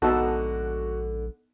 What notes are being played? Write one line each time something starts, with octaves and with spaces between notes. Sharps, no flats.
A#1 G#2 D3 B3 D#4 F#4 A4